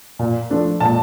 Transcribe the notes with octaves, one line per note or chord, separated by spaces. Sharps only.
A#2
F3 A3 D4
A#2 A5